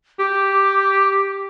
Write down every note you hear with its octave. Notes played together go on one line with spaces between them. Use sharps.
G4 D6